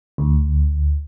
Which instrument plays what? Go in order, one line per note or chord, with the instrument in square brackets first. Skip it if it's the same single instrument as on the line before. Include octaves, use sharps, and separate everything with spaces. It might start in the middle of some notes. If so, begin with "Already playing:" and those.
[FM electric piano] D2